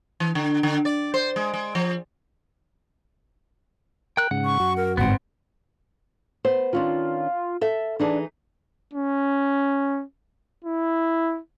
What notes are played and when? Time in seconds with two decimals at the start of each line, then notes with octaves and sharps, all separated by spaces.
0.20 E3
0.35 D3
0.63 D3
0.85 D5
1.14 C5
1.36 G#3
1.54 G#3
1.75 F3
4.17 A#4 G5 F#6
4.31 G#2 C#3 F#5
4.45 C#6
4.60 F#2 F#4
4.77 A#4
4.97 G1 G#2 B3 C4 F#5
6.45 B3 C5
6.73 D#3 C#4 D4 F4
7.61 A4 E5
7.99 E3 D4 D#4 G#4
8.93 C#4
10.65 E4